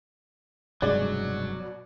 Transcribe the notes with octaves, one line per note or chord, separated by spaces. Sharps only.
F1 G2 B2 F#3 G#3 D5